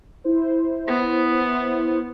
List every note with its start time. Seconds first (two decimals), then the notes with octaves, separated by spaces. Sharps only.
0.24 E4 C5
0.88 B3